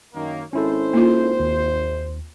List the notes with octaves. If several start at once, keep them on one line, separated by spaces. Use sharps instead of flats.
F#2 D#3 A#3
G#1 C#4 E4 A4 C5
A#3 D#4 F4
D#2